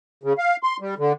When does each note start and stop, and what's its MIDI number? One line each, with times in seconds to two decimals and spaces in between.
0.23 0.33 49
0.38 0.56 77
0.63 0.77 84
0.80 0.94 55
0.98 1.12 50